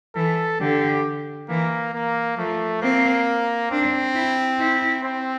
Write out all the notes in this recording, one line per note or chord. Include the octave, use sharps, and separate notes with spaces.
E3 A4
D3 G4
E3 A#3
A#3
F3 A3
A#3 C4
C4 D4
E4
E4
C4